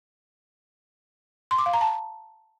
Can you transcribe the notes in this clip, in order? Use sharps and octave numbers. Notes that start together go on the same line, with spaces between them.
C6
D6
F5
A#5
A5